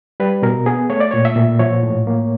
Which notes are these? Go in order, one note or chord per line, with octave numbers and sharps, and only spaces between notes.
G3 B4
B2 A#4
B3 G#4
A3 C#5
D5
A#2 C#5
E5
A#2
F3 C#5
A2
A#3